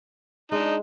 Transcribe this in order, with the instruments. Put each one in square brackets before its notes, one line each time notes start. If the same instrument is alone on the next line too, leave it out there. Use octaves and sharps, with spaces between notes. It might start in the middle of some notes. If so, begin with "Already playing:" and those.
[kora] G#3 [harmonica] D4 D#4